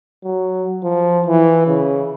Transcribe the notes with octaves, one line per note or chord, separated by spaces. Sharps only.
F#3
F3
E3
C#3